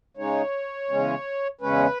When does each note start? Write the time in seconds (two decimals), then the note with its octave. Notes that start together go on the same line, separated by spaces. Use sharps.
0.17 C#3 G#3 D#4 C#5
0.89 E2 C#3 G#3 C#4
1.61 E2 C#3 G#3 C#4 B4